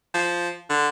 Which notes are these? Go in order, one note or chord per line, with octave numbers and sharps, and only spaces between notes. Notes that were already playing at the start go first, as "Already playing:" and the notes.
F3
D3